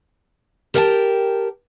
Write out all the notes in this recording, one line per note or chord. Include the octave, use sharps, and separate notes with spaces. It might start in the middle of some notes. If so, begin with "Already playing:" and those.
G4 A#4 C#5 F#5 G5 A5